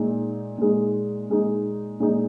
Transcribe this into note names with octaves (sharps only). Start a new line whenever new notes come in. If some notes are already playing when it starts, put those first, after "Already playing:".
Already playing: A#2 G#3 D#4
A#2 G#3 D#4
A#2 G#3 D#4
A#2 G#3 D#4